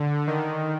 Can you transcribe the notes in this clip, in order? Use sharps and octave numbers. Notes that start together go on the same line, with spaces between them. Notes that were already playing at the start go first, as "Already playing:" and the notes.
Already playing: D3
D#3